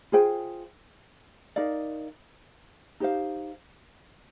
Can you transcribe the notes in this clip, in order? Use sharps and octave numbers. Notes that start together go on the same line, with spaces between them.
F4 G#4 C5 G5
D#4 A#4 D5 F5
D#4 G4 C5 F5